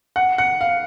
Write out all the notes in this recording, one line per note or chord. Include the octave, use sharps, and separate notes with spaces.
F#5
F#5
F5